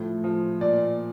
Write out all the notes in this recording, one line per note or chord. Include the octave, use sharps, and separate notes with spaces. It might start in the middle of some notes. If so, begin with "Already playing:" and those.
Already playing: A2 F3
F3
A#2 D5